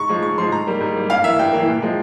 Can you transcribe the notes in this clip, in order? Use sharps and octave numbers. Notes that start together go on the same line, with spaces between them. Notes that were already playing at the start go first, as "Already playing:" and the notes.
Already playing: G#2 C#6
F3 G#3
G#2 C#6
F3 G#3 C6
G#2 A#5
G3 A#3
G#2
G3 A#3
G2 F5
E3 A#3 E5
G2 G5
E3 A#3
A#2
F3 G#3